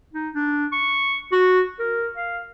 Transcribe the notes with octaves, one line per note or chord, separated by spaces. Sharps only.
D#4
D4
C#6
F#4
A#4
F5